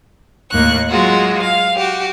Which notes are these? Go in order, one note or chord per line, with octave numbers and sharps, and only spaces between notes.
D#2 A2 A#3 C#6 F#6
F#3 G#3 F4 F#4
F5
F#4 G4